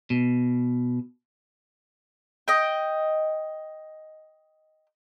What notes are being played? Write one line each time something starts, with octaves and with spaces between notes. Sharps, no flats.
B2
D#5 G5